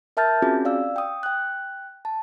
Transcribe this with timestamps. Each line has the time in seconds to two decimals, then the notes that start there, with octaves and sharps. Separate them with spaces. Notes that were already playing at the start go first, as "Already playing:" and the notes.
0.17 A#4 E5 A5 F6 G6 A6
0.42 C4 C#4 F4 F#4 G#4
0.65 D5 F5 E6
0.96 G5 D#6
1.23 G5 F#6
2.05 A5